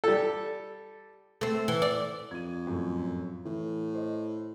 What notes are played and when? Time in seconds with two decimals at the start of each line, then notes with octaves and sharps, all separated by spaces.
0.04 G3 A4
1.41 A3 C4
1.68 E3
1.82 D5
2.31 F2 G#6 D#7
2.67 F#2 A2
3.45 A2 E3
3.94 C5 D#5